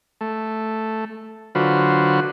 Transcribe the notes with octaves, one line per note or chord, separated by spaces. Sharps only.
A3
D3 F#3 F4 F#4 B4 C5